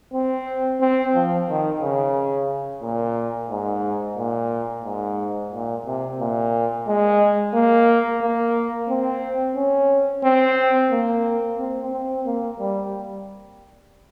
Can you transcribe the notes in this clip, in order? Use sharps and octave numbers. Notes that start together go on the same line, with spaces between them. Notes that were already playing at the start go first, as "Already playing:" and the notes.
C4
C4
F3
D#3
C#3
A#2
G#2
A#2
G#2
A#2
C3
A#2
G#3
A#3
A#3
C4
C#4
C4
A#3
C4
C4
A#3
G3